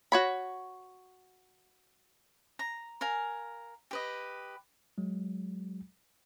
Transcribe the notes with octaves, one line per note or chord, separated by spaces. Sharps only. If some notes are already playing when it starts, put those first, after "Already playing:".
F#4 C#5 B5
A#5
A#4 F5 G#5
G4 B4 D#5
F#3 G#3